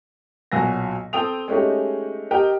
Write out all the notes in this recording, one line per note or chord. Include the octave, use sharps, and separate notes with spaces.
B1 A#2 F#3 G#5 A#6
C4 A4 G5 D#6 F7
G#3 A3 C#4 D#4 G4
G4 A#4 D#5 G5